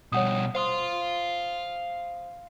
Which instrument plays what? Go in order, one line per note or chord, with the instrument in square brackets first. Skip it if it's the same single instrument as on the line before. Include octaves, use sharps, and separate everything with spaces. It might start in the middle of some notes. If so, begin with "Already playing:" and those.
[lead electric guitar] B2 G3 [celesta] C#5 F#5 D#6
[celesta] C5 D#6 [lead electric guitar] F5 C6